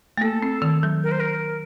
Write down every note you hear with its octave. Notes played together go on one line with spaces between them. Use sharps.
A3
A#3 A4
C4
D#3
F#3
A#4
C5
A#4